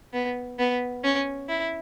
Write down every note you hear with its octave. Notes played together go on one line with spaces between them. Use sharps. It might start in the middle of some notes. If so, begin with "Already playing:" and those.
B3
B3
C#4
E4